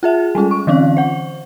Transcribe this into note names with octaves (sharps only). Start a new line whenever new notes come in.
F4 G#4 E5
G3 G#3 C#4 F4
C#6
D3 E3 C4 C#4 F5
C5 F#5